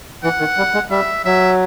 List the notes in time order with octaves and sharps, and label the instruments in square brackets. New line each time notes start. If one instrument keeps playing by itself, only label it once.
[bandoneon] E3 [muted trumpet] F#5
[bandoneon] D#3
G3
G#3
[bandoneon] G3 [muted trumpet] E5
[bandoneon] F#3 [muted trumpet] E5